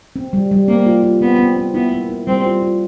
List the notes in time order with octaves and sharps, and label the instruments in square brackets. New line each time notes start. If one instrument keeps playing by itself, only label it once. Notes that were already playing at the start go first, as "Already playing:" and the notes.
[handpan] C4
G3
G3
[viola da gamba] A#3 [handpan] C4
[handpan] F4
F4
[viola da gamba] B3 [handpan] C4
[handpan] C4
C4
[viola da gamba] B3 [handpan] E4
[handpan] A#3
E4
[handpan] G3 [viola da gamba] C4
[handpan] F4
F4